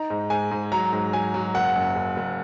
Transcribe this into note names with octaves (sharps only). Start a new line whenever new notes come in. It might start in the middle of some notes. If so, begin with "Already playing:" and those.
Already playing: D#4 A#5
G#2
G#2 G#5
G#2
F#3 A#5
G#2
F#3 G#5
F#3
F#1 F#5
F#2
F#1
F#1